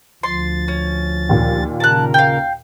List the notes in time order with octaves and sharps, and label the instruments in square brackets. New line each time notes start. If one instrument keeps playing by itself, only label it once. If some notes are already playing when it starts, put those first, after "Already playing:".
[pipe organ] D2 F3 A6 [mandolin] C6
[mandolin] C#4
[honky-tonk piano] D#2 A#2
[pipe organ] C#3 A#4 [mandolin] A5 F#6
[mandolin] F5 G5